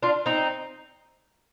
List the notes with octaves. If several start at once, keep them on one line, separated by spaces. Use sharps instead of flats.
D4 F4
C4 D#4